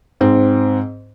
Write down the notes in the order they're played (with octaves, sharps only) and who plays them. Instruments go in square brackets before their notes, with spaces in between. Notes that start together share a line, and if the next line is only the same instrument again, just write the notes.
[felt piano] G#2 C4